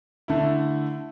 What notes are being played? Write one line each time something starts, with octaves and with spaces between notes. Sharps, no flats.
D3 A3 E4